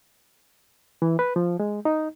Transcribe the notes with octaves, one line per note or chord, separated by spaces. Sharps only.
E3
B4
F3
G#3
D#4